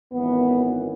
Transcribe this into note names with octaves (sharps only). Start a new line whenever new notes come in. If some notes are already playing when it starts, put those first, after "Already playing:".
G#1 F#2 E3 B3